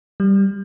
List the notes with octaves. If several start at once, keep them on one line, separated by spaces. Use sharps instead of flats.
G3